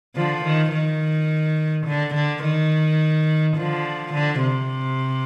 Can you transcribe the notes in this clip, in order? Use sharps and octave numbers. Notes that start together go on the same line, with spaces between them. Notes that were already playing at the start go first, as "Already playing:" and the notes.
D3 F3
D#3
D#3
D3
D3
D#3
D3 F3
D3
C3